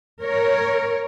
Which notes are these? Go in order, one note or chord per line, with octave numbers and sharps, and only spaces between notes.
A#4 C#5